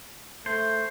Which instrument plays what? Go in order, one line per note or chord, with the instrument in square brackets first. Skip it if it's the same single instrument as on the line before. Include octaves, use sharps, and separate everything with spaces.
[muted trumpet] A3 [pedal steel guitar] C5